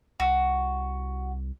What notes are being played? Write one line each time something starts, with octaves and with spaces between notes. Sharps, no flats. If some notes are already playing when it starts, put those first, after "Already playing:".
C2 F#4